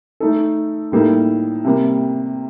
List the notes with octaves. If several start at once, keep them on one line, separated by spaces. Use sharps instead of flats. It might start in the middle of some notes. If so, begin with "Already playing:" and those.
A3 D#4 A4
A2 G3 A#3 D#4 A4
C3 G3 A#3